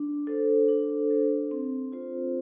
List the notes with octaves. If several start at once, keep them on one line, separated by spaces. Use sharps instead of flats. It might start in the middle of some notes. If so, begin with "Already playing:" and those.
Already playing: D4
A4 C5
D4
A4 C5
C4
F4 C5